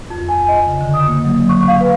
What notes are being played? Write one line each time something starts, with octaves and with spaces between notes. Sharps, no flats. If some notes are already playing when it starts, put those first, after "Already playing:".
F2
G#5
D#5
C#3
D3
D#6
A#3
F#3
C#6
F5
B4